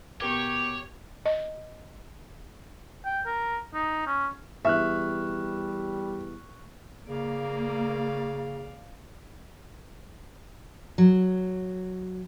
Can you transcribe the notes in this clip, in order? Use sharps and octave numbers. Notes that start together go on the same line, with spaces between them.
B2 G4 A#4 C#5 C#6 D6 G7
D#5
G5
A#4
D#4
C#4
E2 G3 E5 C#6 F6 F#6
C#3 A#3 D5 F5
F#3